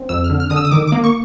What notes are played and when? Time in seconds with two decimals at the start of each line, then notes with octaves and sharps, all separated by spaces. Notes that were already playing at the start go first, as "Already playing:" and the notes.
Already playing: C4
0.09 F2 E6
0.24 F6
0.30 D3
0.40 F6
0.50 D3 D#6
0.56 E6
0.65 D#6
0.71 D#3 D6
0.87 D6
0.92 A#3
1.04 C#6